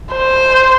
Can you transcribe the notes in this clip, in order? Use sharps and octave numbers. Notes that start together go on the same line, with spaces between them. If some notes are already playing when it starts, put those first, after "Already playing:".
C5